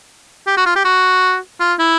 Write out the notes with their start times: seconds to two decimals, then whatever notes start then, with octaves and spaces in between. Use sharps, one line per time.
0.47 G4
0.57 F#4
0.66 F4
0.76 G4
0.85 F#4
1.60 F4
1.79 E4